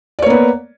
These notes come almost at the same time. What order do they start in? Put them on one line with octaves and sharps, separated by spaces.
D5 C#5 A#3 B3